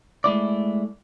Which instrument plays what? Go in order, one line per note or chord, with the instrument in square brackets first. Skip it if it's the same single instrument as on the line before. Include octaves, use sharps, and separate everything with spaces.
[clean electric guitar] G#3 A3 E4 D5